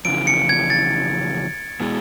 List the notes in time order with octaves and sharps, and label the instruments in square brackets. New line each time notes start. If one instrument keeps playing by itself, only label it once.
[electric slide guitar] F2 C#3 E3 [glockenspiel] D7
[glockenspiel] C#7
G#6
A6
[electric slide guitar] B2 G#3 B3 E4 G#4